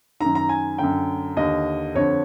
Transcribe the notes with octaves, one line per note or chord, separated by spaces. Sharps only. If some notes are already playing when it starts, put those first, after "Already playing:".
F#2 D#3 A#5
A#5
G#5
F#2 D3 G5
D#2 D3 D#5
F2 D3 C#5